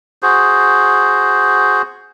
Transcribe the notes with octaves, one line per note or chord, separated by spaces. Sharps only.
F#4 G#4 C5